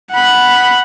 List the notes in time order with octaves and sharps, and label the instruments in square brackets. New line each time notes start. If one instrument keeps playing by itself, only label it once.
[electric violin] F#5 B5